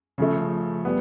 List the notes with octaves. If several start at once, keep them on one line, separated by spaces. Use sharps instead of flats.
C#3 F3 A3
G3 B3